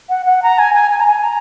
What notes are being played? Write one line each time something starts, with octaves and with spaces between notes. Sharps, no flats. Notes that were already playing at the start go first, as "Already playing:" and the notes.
F#5
F#5
A#5
G#5
G#5
G#5
A#5
G#5
A#5